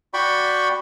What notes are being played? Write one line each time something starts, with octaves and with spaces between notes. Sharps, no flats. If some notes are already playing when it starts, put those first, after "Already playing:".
F#4 D5 G5 B5 C#6